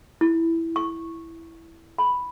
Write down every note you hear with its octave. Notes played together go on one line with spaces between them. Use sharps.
E4
C#6
B5